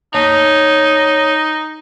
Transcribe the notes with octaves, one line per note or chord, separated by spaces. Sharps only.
D#4 C#5 A5